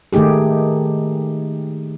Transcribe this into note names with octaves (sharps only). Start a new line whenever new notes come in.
D#3 A3 D#4 G4 G#4